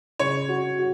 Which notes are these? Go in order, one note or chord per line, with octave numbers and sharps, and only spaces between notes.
C#3 C#5
F#4
F#4